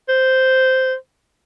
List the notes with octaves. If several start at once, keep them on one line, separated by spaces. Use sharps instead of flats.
C5